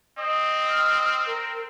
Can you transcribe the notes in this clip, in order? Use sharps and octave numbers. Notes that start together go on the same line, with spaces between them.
C4 D#5
F6
A#4